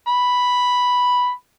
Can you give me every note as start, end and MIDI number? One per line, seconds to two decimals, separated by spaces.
0.08 1.31 83